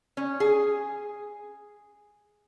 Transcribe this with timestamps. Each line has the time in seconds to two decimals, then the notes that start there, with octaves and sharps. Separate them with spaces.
0.17 C#4
0.40 G#4